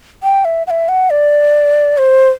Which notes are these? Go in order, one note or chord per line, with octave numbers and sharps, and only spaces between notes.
G5
E5
F#5
E5
F#5
D5
C5